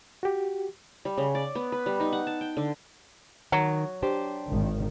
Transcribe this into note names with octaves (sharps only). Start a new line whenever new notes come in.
F#4 G4
G3
C#3
D5
B3
B4
G3
D#4
F#5
A5
G5
D3
D#3 F#3
D4 G4 C5
G#1 D#3